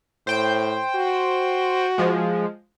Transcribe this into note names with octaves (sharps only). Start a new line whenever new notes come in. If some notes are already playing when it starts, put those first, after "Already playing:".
A2 C5 G5
F#4
F3 G#3